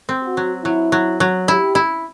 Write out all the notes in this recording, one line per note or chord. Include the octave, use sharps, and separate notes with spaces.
C4
F#4
F#3
F#3 E4
F#3
F#3
E4 G4
E4